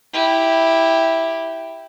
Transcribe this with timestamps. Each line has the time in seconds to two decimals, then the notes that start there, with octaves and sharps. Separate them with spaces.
0.13 E4 G4